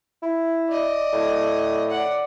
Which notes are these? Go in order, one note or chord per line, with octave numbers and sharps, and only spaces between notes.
E4
D5 D#5
A2
D5 F#5